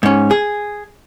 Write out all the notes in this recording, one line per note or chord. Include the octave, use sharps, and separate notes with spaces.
G#2 C#4
G#4